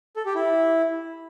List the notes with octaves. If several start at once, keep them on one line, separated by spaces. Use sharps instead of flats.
A4
G4
E4